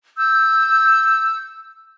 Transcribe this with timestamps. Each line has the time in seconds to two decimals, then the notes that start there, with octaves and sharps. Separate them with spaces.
0.17 E6 G6